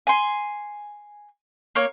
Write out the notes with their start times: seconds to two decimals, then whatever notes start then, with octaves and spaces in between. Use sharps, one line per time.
0.07 G#5 C6
1.75 A#3 C#5